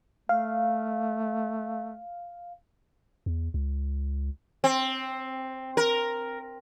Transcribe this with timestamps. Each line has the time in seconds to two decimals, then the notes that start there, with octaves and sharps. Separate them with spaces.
0.29 A3 F5
3.26 E2
3.54 C#2
4.64 C4
5.77 A#4